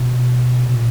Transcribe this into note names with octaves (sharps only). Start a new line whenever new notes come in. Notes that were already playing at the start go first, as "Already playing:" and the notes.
Already playing: B2
B2
A#2